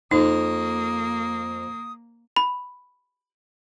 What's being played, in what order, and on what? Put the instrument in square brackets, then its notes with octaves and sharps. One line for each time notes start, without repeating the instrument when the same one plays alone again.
[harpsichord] F2 [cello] A#3 [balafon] D#4 [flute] D#6
[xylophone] B5